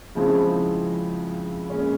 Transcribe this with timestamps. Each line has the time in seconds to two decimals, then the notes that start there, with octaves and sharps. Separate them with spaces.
0.15 C#3 F3 G#3 C4 E4
1.70 A#2 G#3 C#4